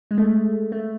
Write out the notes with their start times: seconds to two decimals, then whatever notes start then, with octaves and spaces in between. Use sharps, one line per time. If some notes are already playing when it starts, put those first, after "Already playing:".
0.11 G#3
0.18 A3
0.72 A3